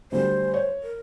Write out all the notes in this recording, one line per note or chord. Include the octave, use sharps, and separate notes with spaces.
D2 G3 C5
C#5
A#4